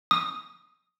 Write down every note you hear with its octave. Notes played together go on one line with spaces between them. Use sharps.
D#6